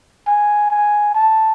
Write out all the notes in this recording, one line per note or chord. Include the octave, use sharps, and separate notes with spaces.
G#5
G#5
A5